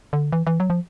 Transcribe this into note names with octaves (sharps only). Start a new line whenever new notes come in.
D3
E3
E3
F#3
F3